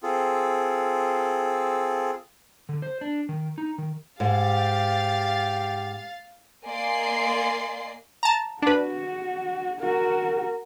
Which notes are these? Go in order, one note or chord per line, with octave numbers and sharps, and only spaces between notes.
C4 F4 G#4 A4
D3
C5
D4
D#3
D#4
D#3
G#2 G4 F5 A6
A#3 D5 D#5 G#5 C6 C7
A5 A#5
D4 F#4 B4
F#4 A#4